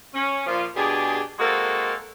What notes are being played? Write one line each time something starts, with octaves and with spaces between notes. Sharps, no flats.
C#4
A#2 F3 F4
B2 D4 G4 G#4
G#3 A#3 C4 F#4 A4